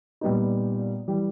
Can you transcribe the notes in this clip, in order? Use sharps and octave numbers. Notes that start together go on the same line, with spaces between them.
A#2 G3 B3 D#4
E3 G3